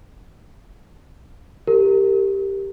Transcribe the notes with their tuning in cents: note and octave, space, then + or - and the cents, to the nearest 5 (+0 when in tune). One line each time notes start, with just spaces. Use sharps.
G4 +0 A#4 -25